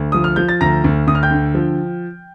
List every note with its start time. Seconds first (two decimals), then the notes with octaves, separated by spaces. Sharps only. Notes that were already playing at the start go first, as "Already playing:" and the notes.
Already playing: D2
0.12 F3 D#6
0.24 F6
0.36 F3 G6
0.49 A6
0.61 D2 A#5 A#6
0.84 D2
1.07 D2 D#6
1.15 F6
1.23 G5 G6
1.31 D3
1.55 F3